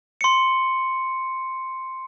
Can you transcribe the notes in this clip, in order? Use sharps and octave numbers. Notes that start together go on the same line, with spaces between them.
C6 C#7